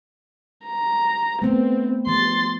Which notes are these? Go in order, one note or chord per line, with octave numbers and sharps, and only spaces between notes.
A#5
A3 B3 C4
F3 C6 A6